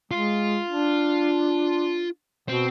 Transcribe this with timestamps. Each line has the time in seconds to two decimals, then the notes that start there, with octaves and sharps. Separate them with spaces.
0.11 G#3 F4
0.69 D4
2.48 B2 C4